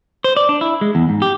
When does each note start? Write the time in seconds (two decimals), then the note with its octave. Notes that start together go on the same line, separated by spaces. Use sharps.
0.24 C5
0.37 D5
0.49 D4
0.61 E4
0.81 G#3
0.95 E2
1.09 G#2
1.22 G4